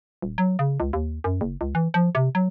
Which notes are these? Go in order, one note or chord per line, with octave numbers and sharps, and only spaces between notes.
D#1
F#3
C#3
C#2
D#2
F#2
F#1
C#2
E3
F3
C3
F#3